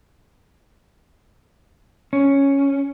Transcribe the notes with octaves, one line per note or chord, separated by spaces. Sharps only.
C#4